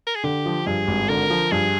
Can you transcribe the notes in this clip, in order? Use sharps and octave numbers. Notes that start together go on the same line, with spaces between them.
A#4
G#4
D3 G4
F3
G2 G#4
G#1
D3 A#4
F3
G2 G#4